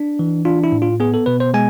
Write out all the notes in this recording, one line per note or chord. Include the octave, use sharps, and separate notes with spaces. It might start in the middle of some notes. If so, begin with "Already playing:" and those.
Already playing: D4
E3
D4 F4
E4
A2
F4
B3 G#4
A4
B2 B4
C5
G#3 G#5